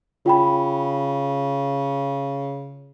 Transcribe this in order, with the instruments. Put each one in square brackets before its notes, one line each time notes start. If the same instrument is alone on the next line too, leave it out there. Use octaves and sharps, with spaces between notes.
[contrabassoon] C#3 [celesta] F4 G5 B5